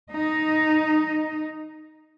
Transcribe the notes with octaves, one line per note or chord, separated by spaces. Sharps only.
D#4 D#5